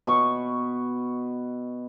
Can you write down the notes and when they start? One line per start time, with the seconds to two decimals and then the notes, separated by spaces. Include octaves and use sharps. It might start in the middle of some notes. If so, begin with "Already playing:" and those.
0.07 B2 B4 C#6